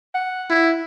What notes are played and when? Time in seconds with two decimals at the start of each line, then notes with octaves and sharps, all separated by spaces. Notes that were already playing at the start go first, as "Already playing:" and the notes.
0.15 F#5
0.50 E4